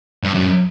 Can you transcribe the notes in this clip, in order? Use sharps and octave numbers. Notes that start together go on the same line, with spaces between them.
G2
F#2